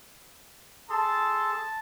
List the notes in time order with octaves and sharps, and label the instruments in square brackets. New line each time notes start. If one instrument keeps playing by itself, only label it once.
[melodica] G#4 A4 C6 [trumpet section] A5